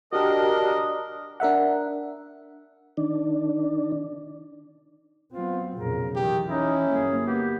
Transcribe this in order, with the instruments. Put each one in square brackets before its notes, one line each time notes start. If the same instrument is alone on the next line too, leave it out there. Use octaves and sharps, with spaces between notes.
[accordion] D4 A#4 [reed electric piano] F#4 G4 [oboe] D#5
[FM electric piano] D4 A#4 E5 F#5
[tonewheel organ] D#3 D4
[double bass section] F#3 B3 C4 [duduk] F4
[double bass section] B1 F2 A#2 [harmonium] C#3 [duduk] A#4
[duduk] D#3 [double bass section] E3 [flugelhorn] G4
[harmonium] C#4 [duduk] D#4 [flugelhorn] E4
[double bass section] G1 F#3 A#3 [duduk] G#4
[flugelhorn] B3 [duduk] G4